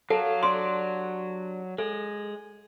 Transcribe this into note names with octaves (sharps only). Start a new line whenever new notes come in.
F#3 A4 F5 A5
D4 G4 C6 D6
G#3 A4